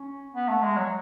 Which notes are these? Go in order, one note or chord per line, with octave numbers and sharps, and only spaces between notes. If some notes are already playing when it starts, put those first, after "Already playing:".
Already playing: C#4
B3
A3
G#3
F#3